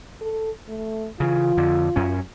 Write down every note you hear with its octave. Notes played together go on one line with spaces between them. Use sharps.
A4
A3
C#3 E3 F4
F2 D3
F#2 C#4